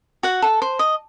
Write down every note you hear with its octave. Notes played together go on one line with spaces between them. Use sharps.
F#4 F#5
A4
C5
D#5